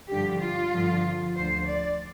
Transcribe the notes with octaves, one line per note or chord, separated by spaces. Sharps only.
G2 D3 F3 G4
F4
G2 D3 F3
D2 D3 F3 C5
D5